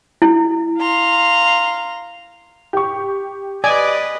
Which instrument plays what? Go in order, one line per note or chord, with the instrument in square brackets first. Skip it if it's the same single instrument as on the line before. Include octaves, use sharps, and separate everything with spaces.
[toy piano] E4
[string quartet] F5 A#5 C6
[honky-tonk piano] G4 C#6
[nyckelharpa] B4 D#5 [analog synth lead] D5 [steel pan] G#5